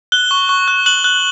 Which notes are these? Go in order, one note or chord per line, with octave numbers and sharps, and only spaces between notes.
F#6 G7
C#6
C#6
F#6
F#6 F#7
F#6